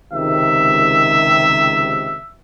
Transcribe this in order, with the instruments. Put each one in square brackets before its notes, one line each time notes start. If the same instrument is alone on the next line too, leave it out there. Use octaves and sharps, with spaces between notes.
[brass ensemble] C#2 C3 D#3 [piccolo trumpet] E5